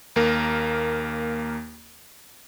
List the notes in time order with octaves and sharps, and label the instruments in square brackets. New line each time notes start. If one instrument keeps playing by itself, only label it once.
[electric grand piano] D#2 A#3 A#4